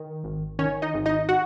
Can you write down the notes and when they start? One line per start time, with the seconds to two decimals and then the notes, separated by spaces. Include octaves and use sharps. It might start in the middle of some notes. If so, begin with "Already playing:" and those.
Already playing: D#3
0.24 G#1
0.59 D#3 C#4 C#5
0.82 D#4 D#5
0.94 G#1
1.06 D#4 D#5
1.29 F#4 F#5